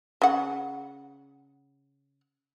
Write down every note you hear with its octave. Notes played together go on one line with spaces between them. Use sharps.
C#3 F#5